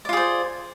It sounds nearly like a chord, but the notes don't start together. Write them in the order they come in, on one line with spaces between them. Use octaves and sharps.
D5 F4 G#4 C5